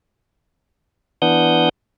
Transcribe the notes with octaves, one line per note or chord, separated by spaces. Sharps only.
E3 B3 D4 F#5 D#6 G6